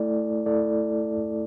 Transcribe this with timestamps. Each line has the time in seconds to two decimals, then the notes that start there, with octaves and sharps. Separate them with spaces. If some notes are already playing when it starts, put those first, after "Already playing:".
Already playing: A3 E4 A4 D5
0.46 A3 E4 A4 D5